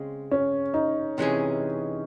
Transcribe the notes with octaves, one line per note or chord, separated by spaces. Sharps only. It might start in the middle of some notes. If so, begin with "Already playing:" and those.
Already playing: C#3 G#3 C4
C#4
D#4
C3 E3 G#3 C#4 G#4